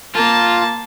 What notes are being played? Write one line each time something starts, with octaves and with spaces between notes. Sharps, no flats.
A#3 F4 A5